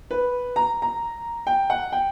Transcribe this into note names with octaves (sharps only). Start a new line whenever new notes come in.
B4
A#5
A#5
G5
F#5
G5